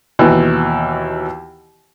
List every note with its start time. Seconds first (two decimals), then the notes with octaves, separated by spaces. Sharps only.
0.19 D#2 B2 E3